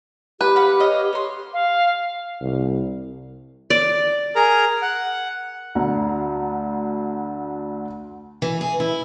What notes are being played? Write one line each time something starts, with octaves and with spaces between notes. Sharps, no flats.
G4 B4
F5 F#5 B5
C#5 D#5 F5
C#5 C6
F5
C2
D5
G#4 A#4 A#5
F#5
D2 D3 A#5
E3
G#4
E4